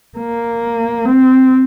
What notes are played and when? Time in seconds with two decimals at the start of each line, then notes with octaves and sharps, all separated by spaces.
0.18 A#3
1.05 C4